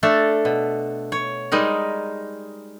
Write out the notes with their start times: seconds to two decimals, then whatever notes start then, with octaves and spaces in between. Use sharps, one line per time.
0.03 A3 D4 A4
0.45 B2
1.12 C#5
1.52 G3 G#3 D#4 A#4